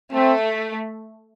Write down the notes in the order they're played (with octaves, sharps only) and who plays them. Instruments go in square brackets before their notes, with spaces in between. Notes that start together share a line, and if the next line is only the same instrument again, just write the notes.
[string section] A3 [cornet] C4